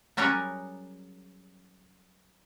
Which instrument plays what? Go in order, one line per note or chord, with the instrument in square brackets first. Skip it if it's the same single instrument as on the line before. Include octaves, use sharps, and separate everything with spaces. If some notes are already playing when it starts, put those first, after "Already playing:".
[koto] F#3 G3 C#4 G#4 A#4 C#5